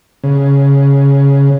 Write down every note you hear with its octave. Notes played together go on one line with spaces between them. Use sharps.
C#3